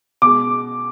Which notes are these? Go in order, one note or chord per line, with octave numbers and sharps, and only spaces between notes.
B2 G#3 D6